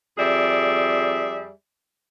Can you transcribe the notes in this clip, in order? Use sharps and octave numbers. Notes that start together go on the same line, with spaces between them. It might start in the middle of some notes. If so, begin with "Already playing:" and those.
F2 G3 G#4 D5 E5